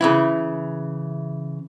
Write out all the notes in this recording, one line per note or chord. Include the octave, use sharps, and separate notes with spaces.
C#3 E3 E4